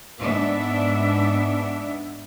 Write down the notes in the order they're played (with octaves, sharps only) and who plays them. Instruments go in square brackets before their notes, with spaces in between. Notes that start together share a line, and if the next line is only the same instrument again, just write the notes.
[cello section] G#2 B3 D4 E5